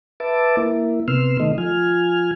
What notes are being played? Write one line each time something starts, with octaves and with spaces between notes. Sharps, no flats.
B4 E5 A5 D6
A#3 E4
C3 B3 C6 E6 F6
D#3 A3 D#5
F3 G#5 F6